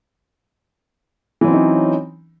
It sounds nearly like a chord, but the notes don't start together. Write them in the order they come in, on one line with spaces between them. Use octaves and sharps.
E3 F#3 C4 C#4 D#4